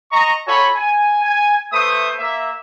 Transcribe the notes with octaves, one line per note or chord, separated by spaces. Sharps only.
D#5 A#5 C#6
F4 F#4 A4 C#5 G#5 B5
G#5
G#5
A3 B4 C5 E5 C#6 D#6
A#3 E5